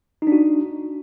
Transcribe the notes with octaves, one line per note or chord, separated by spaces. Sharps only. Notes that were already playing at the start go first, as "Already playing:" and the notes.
D4 D#4 F#4